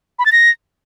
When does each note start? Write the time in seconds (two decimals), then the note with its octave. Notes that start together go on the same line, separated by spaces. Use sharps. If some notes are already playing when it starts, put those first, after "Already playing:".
0.19 B5
0.25 A6
0.32 A#6